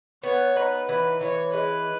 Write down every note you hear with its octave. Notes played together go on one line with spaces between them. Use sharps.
B3 C#5
D#4 B4
E3 B4
E3 C#5
G#3 B4